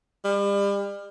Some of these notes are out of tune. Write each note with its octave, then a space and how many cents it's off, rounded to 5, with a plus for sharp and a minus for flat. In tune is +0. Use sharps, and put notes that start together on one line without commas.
G3 +35